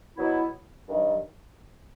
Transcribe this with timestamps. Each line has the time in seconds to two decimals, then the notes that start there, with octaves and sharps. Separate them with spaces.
0.16 B2 F#3 B3 E4
0.88 G2 D#3 F#3